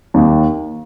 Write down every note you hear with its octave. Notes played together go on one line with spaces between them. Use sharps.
D#2